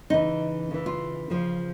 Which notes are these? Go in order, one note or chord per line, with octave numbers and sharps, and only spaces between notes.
C#3 E3 D#4
C#3 E3
F4
C#3 F3